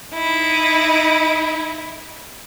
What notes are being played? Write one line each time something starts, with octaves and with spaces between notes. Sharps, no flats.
D#4 E4